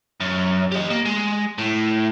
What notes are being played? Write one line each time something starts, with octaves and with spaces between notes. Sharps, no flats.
F#2
G4 D#5
A#3
G#3
A2